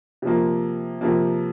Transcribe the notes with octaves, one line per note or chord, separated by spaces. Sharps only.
C3 F3 A#3
C3 F3 A#3